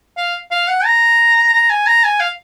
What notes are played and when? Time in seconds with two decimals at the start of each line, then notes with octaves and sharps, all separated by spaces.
0.17 F5
0.51 F5
0.68 F#5
0.85 A#5
1.53 A#5
1.70 G#5
1.87 A#5
2.04 G#5
2.20 F5